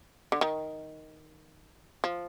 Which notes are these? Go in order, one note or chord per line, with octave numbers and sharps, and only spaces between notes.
D3
D#3
F3